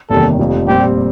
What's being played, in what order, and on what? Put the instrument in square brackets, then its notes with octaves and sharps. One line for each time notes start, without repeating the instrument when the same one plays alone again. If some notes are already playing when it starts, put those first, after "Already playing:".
[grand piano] F#1 E2 C3 D#3 G3 [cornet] A4
[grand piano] F1 F2 C3 F3
[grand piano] A#2 G3 C4 [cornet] G4